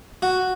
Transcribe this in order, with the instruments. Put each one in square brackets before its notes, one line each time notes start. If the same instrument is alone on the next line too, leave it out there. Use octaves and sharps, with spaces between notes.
[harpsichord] F#4